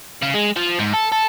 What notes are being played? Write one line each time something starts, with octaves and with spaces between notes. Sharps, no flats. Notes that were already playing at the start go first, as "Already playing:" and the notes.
C#3
G#3
F3
G#2
A4
A4